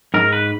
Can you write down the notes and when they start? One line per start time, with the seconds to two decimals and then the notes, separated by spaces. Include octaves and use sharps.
0.14 G#2 A#4
0.32 B4